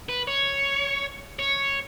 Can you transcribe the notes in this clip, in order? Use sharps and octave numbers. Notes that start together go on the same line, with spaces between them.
B4
C#5
C#5